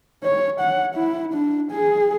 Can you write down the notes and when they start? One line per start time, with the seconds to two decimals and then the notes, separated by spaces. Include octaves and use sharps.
0.24 C#5
0.60 F#5
0.95 E4
1.33 D4
1.71 G#4